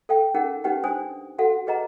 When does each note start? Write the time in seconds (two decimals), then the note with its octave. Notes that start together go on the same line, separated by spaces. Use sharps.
0.09 A4 F5 G5
0.34 C#4 D#4 G#4 A#4 F#5
0.64 C#4 D#4 G4 B4 F#5 G5
0.84 D4 C5 G#5 D#6
1.38 F#4 A4 F5 F#5
1.67 G#4 B4 D#5 F#5 A#5